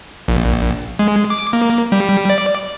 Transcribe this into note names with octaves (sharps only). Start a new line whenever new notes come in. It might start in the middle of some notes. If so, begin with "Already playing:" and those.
A#1
G#3
D6
A#3
G3
D5